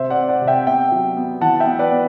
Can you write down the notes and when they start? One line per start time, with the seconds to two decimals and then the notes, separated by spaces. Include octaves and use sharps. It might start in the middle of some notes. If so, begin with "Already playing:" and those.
Already playing: C3 C5 E5
0.10 D5 F#5
0.16 C3
0.29 D5 F#5
0.41 C3
0.48 E5 G5
0.67 B3 E5 G5
0.92 F#3
1.17 B3
1.41 E3 F#5 A5
1.60 E5 G5
1.66 B3
1.79 B4 D5
1.92 B3